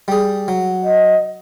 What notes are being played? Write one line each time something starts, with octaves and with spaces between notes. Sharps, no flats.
G3 G#4
F#3
D#5